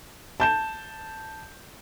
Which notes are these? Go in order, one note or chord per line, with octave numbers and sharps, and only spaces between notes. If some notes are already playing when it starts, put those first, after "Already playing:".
A5 G6 E7